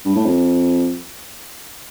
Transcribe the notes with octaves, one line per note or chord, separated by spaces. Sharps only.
G2
A2
F2